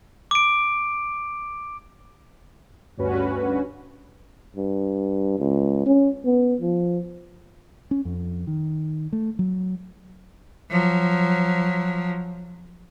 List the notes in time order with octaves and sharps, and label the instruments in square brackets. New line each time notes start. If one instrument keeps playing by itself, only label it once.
[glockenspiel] D6 D7
[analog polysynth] D2 G2 C#4 F#4 B4
[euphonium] G2
C#2
C#4
B3
F3
[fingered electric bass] C#4
F2
D#3
A3
F#3
[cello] F3 F#3